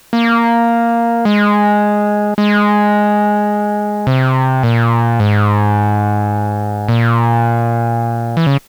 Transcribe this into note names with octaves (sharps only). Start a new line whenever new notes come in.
A#3
G#3
G#3
C3
A#2
G#2
A#2
E3
C#3